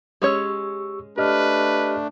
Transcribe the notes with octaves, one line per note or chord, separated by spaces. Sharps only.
G#3 C#4 G4 C#5 C#6 E6
A3 D4 G4 B4 D#5 F6